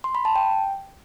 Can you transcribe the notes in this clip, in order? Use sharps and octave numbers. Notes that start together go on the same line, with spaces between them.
C6
B5
A5
G5